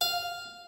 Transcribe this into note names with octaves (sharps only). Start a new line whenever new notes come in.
F5